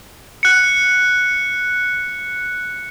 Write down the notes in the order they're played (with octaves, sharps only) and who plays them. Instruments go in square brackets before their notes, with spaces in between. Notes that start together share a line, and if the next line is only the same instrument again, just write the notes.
[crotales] F#6 C#7